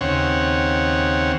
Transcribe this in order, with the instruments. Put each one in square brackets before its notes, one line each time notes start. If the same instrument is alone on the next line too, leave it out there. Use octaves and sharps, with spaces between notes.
[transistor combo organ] D#2 C#3 C4 C#5 F#5